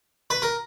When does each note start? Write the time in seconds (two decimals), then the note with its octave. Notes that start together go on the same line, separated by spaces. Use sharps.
0.30 B4
0.42 A#4